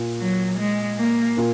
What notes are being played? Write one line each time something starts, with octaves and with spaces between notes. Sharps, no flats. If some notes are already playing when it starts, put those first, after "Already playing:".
Already playing: A#2
F#3
G#3
A#3
A#2 A#3